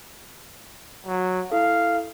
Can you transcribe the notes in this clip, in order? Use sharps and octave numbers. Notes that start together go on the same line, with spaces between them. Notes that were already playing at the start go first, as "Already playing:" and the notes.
F#3
E4 A4 F5